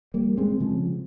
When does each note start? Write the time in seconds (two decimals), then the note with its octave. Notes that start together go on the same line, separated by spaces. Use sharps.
0.14 G3 A#3
0.37 G#3 C4
0.60 C#3 F3